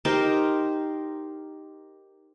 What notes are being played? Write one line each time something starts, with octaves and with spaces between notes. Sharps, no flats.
D#4 G4 A#4 C5